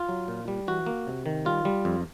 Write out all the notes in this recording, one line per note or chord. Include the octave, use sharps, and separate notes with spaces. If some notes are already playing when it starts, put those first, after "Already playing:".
Already playing: F4
F#3
A#2
G3
E3 F#4
A#3
C3
D#3
G3 F4
G3
F2